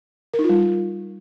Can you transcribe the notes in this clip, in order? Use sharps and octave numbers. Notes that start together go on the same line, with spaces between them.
A#4
D#4
F4
G3